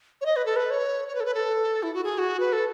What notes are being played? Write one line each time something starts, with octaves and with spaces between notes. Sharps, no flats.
C#5
D#5
B4
A4
B4
C#5
C#5
B4
A4
B4
A4
E4
F#4
G#4
F#4
B4
A4